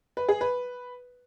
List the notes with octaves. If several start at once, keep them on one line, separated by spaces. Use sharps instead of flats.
B4
G#4
B4